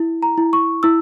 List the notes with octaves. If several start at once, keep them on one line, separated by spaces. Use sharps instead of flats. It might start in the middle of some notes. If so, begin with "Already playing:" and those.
Already playing: E4
A#5
E4
C#6
E4 E6